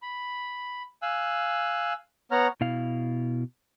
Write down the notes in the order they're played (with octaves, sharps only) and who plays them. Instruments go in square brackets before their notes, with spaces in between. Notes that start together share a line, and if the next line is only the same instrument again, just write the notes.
[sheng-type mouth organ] B5
F5 G#5 E6 F#6
B3 C#5 F#5 A#5 F6
[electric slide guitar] B2 E4 F5